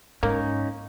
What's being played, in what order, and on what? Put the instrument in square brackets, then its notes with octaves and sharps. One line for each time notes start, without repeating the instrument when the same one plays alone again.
[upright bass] G#2 [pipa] A#3 [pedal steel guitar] C#4 D#4